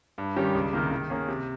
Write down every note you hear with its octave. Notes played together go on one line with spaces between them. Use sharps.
G2
D#3 G3 C#4 G4
C#2
C3 D#3 A#3
D#3
A#3 C#4 G#4
C3